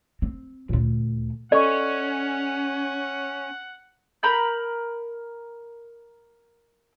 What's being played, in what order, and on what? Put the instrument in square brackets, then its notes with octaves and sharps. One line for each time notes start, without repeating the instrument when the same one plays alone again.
[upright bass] C4
D2 A#2
[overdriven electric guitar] C#4 [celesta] A4 D#5 C#6 [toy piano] D5 [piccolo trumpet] F#5
[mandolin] A#4 A#5 B5 G6